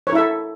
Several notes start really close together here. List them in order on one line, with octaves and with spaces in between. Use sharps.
C#5 A#4 E4 E5 A4